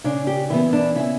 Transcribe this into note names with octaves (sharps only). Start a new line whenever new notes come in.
C#3 D4
G4
E3 B3 E4
D4
C#3 E4